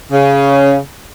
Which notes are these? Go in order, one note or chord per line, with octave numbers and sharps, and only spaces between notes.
C#3